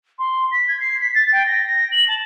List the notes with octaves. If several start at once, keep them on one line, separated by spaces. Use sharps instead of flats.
C6
B6
G#6
C7
B6
A6
G5
A#6
F#7
A5